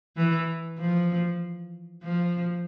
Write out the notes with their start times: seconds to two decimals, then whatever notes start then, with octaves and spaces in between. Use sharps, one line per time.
0.17 E3
0.78 F3
2.03 F3